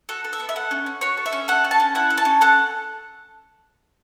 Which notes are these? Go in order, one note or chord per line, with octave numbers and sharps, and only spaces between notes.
F#4 A4
A4
E5
B3
E5
A4 F#5
C#4
C#4
F#4 C#5
A4
E5
C#4
A4 F#5
C#4
A5
C#4
E4 F#5
A4
A5
C#4
A4 F#5